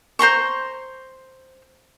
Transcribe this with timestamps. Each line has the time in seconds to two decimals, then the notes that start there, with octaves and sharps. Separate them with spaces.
0.19 C5 A#5 C6 C#6